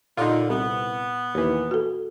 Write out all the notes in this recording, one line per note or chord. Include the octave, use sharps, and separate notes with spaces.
D#2 A#2 D3 D#4 F4
C2 B3
D#2 E3
F#4 A4